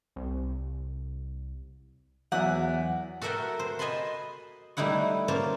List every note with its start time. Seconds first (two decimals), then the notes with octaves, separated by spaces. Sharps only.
0.16 C2
2.32 E2 F#3 E5 F#5 G#5
3.21 F#4 A4 A#4 E5 F#5 G5
3.59 C5
3.79 D#5 G#5 A5 B5 C6
4.77 G3 A3 D#4 E4 F#5
5.28 A#3 C#4 C5 F5 A5